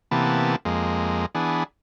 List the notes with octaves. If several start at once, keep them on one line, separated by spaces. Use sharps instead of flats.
C3 E3 A#3 B3 A5
F2 G#3 A#3
E3 B3 D4 G#4